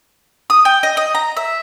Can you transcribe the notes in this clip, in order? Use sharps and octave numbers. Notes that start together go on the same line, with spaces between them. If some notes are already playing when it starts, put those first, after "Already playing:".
D#6
G5
D#5
D#5
A#5
E5